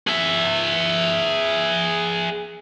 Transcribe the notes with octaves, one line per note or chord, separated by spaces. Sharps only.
G#4 E5